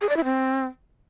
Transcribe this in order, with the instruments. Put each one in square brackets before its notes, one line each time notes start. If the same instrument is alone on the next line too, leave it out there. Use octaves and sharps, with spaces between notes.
[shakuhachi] G#4
D5
E4
C4